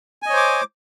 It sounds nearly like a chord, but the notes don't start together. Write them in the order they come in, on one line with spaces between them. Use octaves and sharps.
G#5 D#5 C#5 C5 D6